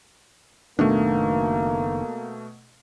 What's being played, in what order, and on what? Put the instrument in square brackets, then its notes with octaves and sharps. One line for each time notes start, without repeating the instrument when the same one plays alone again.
[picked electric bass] F#1 D#3 D4 [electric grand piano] B2 A3 [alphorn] A#3